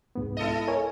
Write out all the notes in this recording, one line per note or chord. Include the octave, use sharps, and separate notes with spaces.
C2 G#2 B3
E4 A4 D#5
A#4 C#5 G#5